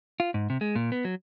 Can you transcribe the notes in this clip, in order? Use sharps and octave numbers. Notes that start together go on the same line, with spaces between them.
F4
G#2
C3
G#3
A#2
B3
F#3